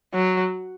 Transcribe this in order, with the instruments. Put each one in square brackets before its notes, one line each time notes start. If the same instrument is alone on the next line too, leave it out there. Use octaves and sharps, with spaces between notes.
[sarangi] F#3